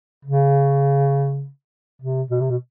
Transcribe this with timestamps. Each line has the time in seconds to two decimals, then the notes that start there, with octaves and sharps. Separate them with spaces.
0.25 C#3
2.02 C3
2.31 B2
2.41 C3
2.50 B2